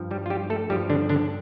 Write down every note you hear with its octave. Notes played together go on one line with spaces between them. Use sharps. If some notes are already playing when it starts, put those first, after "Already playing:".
Already playing: G2 F3
G3 G4
F4
G3 G4
A3 A4
G2 F3 G3 G4
D3 D4
D3 D4